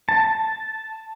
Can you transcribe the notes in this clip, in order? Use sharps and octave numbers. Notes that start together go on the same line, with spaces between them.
A5